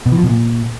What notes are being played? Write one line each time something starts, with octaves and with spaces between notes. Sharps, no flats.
B2
E3
F3
B2
A#2